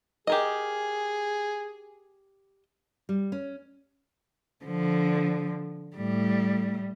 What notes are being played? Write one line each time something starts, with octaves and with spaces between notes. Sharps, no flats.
G4 G#4 A#4 D#5
G3
C#4
D3 F3
A2 G3